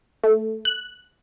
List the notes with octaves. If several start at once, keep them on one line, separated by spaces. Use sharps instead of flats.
A3
F#6